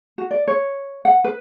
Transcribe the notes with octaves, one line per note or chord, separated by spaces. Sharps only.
F#4
D5
C#5
F#5
B4